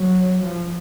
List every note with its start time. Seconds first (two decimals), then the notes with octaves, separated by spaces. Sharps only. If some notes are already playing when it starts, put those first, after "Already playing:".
Already playing: F#3
0.44 F3